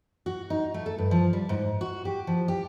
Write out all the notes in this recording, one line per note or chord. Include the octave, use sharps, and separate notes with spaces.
F#4
D#4
A3
A4
G2
F3
G3
G#2
F#4
G4
F3
G4